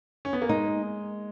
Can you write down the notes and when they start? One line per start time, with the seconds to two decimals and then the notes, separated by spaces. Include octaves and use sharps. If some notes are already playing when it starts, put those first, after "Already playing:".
0.25 C#4
0.33 B3
0.42 A#3
0.49 G#3 D#4